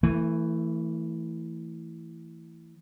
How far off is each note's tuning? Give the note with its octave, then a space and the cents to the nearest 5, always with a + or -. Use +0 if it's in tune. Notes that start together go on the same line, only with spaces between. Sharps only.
E3 +0 A3 +30